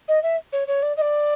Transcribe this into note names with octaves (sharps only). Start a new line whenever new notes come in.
D#5
E5
C#5
C#5
D5
D#5
D5